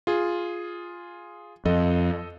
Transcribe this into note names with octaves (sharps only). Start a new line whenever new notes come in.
F4 G#4
F2 A4 D#5